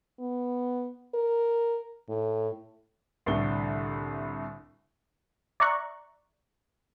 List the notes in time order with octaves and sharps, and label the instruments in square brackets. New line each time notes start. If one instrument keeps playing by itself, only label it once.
[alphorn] B3
A#4
A2
[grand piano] C2 A2 D3 G7
[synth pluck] D5 E5 A#5 C#6 F#6